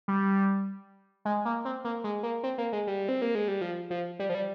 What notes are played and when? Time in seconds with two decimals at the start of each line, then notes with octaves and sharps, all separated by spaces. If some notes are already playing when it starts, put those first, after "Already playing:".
0.08 G3
1.25 G#3
1.45 A#3
1.65 C4
1.85 A#3
2.04 G#3
2.23 A#3
2.43 C4
2.58 A#3
2.73 G#3
2.87 G3
3.09 C4
3.22 A#3
3.35 G#3
3.48 G3
3.61 F3
3.90 F3
4.19 G3
4.29 F3
4.35 G3